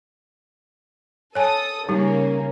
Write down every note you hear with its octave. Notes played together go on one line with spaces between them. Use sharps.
A4 C#5 G#5 A5 D#6
C#3 G3 A#3 C#4 D#4 G4